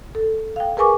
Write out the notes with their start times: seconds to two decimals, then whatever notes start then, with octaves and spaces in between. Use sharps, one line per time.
0.15 A4
0.56 F5 G5
0.77 G#4 A#4 B4 G#5 C#6 D6